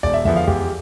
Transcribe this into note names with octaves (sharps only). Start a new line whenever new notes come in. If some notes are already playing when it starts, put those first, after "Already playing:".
E1 D5
E5
E2 D3 F3 B3 E5
F5
E2 G4